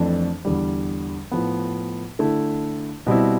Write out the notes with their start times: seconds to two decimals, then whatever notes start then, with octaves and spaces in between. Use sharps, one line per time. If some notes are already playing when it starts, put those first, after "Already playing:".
Already playing: F2 E3 A3 D4
0.45 E2 D3 G3
1.32 A2 F3 B3
2.19 D3 A3 E4
3.07 B2 G3 C4 E4